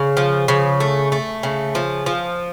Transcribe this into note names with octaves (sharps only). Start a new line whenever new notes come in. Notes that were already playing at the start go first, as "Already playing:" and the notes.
Already playing: C#3
F3
C#3
A3
A3
C#3
F3
F3